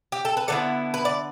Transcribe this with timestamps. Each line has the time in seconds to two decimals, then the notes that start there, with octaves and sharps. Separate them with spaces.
0.12 G4
0.25 A4
0.37 B4
0.48 D3 B3 E4 A4 D5
0.94 B4
1.05 D5